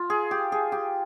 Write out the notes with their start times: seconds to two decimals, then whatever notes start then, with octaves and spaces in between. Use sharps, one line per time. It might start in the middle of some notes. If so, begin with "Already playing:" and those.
Already playing: F4
0.10 G#4
0.31 G4
0.52 G#4
0.72 G4